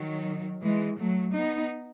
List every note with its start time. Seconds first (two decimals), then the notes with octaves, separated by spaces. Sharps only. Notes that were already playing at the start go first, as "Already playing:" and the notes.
Already playing: D#3 F#3
0.62 E3 G#3
0.98 F#3 A3
1.35 B3 D#4